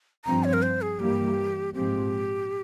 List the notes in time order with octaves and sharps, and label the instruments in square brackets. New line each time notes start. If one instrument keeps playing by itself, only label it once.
[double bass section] G2 F3 C4 [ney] A#5
[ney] C#5
A#4
C5
G#4
[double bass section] G2 E3 G3 A#3 [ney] G4
[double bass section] A#1 G#2 F3 G#3 C4 [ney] G4